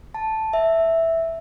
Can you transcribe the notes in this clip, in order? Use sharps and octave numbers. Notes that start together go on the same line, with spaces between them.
A5
E5